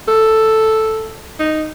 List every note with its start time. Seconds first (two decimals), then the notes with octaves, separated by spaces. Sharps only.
0.08 A4
1.40 D#4